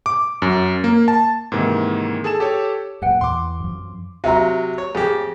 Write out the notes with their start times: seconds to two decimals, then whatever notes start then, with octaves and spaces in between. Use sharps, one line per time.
0.06 D6
0.42 F#2
0.84 A#3
1.08 A5
1.52 G#2 C3 D#3 E3 A#3
2.24 G#4 A4 A5 E7
2.40 G4 A4 C#5
3.02 F#2 A#2 B4 F#5 G5
3.21 E2 C6 D6
3.60 F#2 F3
4.24 C3 F#3 E5 A#5
4.78 C#5
4.95 F2 G4 G#4